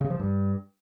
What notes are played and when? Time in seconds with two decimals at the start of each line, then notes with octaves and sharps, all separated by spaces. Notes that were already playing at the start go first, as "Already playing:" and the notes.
0.01 C#3
0.10 F3
0.19 G2